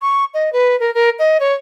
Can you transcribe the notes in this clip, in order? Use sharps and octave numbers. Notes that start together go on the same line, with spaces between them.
C#6
D#5
B4
A#4
A#4
D#5
C#5